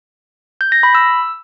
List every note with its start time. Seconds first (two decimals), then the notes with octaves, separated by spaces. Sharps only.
0.61 G6
0.72 A#6
0.83 B5
0.95 E6